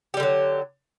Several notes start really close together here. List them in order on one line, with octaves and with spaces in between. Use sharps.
G4 G3 D3 F#3